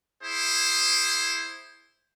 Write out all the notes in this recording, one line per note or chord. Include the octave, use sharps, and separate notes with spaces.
E4 G#4 C5